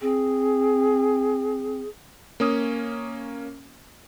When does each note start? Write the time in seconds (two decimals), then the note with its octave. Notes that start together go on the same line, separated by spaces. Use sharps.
0.01 C4 G#4
2.40 A#3 C#4 D#6